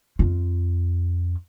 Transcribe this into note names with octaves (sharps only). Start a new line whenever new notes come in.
F2 F4